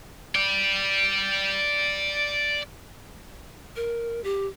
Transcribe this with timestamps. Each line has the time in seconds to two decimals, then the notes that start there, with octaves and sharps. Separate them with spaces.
0.36 D5 G5
3.76 A#4
4.24 G4